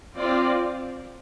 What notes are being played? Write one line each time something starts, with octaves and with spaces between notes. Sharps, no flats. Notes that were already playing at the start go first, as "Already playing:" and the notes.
C4 F4 D5